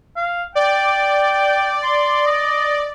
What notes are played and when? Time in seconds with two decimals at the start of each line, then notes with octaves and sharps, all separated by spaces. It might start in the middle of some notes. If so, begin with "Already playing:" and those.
0.16 F5
0.55 D5 G5
1.84 C6
2.26 D#5